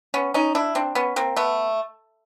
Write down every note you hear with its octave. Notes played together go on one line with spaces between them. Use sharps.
B3 C#4
C#4 D#4
D4 E4
C4 D4
B3 C#4
A#3 C4
A3 B3